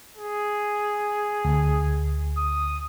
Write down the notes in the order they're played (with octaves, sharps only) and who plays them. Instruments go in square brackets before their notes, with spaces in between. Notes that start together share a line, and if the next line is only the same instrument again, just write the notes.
[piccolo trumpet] G#4
[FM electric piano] D2
[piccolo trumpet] D#6